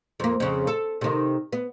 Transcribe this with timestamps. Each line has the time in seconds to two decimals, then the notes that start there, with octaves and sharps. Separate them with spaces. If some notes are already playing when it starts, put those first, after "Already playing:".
0.20 F2 A#3
0.40 F2 C#3
0.67 A4
1.01 C3 D#3
1.53 B3